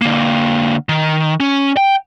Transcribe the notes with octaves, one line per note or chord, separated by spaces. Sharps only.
D3 A#3
D#3
C#4
G5